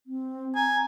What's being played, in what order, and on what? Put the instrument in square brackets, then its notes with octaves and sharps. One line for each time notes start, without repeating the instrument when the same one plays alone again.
[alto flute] C4
[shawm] G#5 [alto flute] A#5